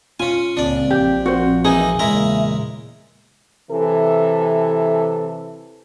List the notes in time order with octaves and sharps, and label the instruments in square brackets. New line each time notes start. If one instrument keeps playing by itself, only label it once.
[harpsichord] C#4 G#5 [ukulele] F4
[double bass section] C#2 A#2 C#3 [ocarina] C4 [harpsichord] D4 D5
[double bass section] A#1 F3 [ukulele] G4
[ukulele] F#4 C5
[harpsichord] E3 A#3 D#4 [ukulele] G#4
[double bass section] E2 A#2 C#3 [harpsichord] G#3 E4 A#4 [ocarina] E5
[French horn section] C3 E3 A4